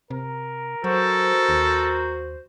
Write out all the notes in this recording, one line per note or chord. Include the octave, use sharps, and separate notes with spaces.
C3 A#4
F#3 F#4 A4 C5
D#2